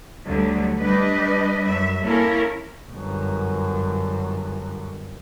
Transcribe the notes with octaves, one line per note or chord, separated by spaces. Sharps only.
D2 D3 F#3 G3 A3
G3 D4 B4 D#5
F#2 E5
A#3 C#4 E4 A4 A#4
G1 F#2